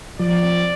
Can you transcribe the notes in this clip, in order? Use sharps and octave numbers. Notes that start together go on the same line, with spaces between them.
F3 D5
C4